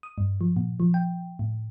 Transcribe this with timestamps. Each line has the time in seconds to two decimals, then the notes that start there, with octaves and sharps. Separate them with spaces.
0.03 D#6
0.18 G2
0.41 F3
0.57 A#2
0.80 F3
0.94 G5
1.39 A2